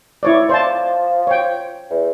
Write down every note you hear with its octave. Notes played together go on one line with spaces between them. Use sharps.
E4 C#5 D5
F3 C5 D5 A5
C#5 G5
E2